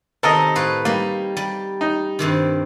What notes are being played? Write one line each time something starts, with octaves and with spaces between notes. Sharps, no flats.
C3 D#3 A4 A#4 D#5
A2 B4 F5
G3 A#3 D#4
G3
D#4
G2 C3 D#3